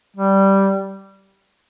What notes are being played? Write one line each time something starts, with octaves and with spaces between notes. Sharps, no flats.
G3